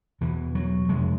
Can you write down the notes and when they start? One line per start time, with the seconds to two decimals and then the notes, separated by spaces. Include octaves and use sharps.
0.21 E2 B2 E3
0.55 F#3
0.89 F2 C3 G#3